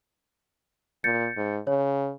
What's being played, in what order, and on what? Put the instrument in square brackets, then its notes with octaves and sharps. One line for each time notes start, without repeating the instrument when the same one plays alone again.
[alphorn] A#2 [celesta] G6 A6 C#7
[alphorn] G#2
[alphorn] C#3 [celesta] C#5